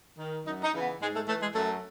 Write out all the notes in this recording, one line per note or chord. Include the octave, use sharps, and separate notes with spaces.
D#3
F#2 D#4
D#4
C#3 E3
B3
G#2 G#3
A3
E3 A3
G#3
F#2 A3